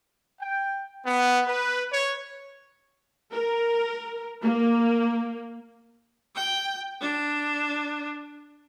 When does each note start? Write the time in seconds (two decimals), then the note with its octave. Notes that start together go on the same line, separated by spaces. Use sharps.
0.41 G5
1.05 B3
1.46 B4
1.92 C#5
3.33 A#4
4.43 A#3
6.35 G5
7.01 D4